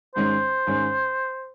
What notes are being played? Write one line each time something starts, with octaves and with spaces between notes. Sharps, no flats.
G#2 D#3 G#3 C#4 C5
G#2 D#3 G#3 C#4